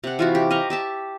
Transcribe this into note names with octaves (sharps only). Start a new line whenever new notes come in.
C3 F#5
E3 F4 F#4
G4
D#5 F5 A#5 C#6
G4 E5 A5